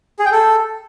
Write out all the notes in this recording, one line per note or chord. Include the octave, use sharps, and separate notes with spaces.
G#4
G5
A4